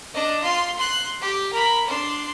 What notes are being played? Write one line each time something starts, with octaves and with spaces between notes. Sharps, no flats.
D4 D#5
F4 C6
C6 F#6
G4
A#4 B5
D4 C6